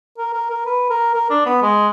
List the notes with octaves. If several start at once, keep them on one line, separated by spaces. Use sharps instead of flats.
A#4
A#4
A#4
B4
A#4
A#4
D4
B3
G#3